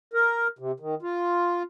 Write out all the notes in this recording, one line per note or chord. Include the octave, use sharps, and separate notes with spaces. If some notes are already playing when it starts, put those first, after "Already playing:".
A#4
C3
D#3
F4